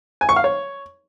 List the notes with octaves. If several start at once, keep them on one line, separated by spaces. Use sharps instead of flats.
G#5
C#6
F5
C#5